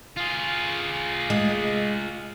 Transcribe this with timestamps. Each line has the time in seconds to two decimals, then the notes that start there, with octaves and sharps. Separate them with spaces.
0.17 F4 G#4
1.30 G#3